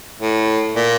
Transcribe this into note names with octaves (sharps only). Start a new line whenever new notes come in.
A2
A#2